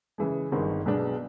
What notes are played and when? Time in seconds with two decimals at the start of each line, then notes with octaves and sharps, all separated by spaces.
0.18 C#3 E3 G#3
0.52 G1 G2 D#3 G#3 C4
0.86 B1 B2 G#3 B3 D4